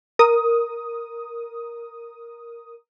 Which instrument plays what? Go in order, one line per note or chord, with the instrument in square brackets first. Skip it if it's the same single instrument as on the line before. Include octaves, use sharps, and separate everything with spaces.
[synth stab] A#4 D#6